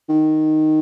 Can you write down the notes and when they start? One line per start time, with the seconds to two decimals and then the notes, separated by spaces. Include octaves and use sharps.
0.09 D#3